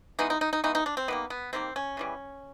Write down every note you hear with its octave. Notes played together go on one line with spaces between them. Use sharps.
E3 G#3 B3 D#4
D#4
D#4
D#4
E3 G#3 B3 D#4
D#4
D4
C4
D#3 G3 A#3 B3
B3
D#3 G3 A#3 C4
C#4
C#3 E3 G3